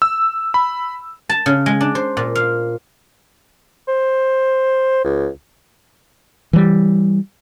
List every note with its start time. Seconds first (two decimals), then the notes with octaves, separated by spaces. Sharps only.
0.02 E6
0.54 B5
1.29 A5
1.46 C#3
1.66 G#3
1.81 D4
1.95 C5
2.17 A#2
2.35 F5
3.88 C5
5.05 C#2
6.53 E3 G3